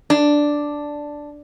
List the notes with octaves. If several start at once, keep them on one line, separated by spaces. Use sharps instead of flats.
D4